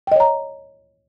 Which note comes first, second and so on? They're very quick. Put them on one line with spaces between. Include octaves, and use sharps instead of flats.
G5 D#5 C#5 A#5